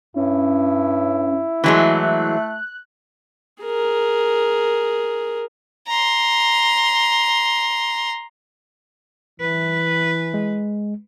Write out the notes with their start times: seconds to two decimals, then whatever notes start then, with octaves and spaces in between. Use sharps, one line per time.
0.16 G2 C#4 E4
1.64 E3 F#3 G#3 A3 F#6
3.64 G#4 A#4
5.87 A#5 C6
9.40 E3 B4
10.34 G#3